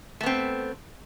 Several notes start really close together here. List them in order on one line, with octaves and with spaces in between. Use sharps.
A3 B3 C4